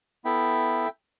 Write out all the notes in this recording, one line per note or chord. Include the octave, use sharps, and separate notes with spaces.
B3 E4 A4 E5 G5